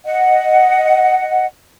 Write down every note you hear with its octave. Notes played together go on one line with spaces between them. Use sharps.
D#5 F#5